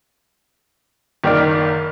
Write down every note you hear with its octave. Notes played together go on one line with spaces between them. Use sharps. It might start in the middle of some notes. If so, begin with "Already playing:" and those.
F#1 D#3 A#3 D5 F6 D7